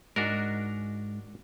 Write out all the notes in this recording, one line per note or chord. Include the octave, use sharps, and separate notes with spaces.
G#2 D4 F#4 A#4